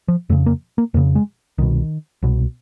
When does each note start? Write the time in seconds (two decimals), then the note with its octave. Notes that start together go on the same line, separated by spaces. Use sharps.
0.08 F3
0.30 F2 C#3 A3
0.46 A#3
0.78 A#3
0.94 F2 A#3
0.97 C#3
1.15 G#3
1.58 C2 B2 D#3
2.23 C2 B2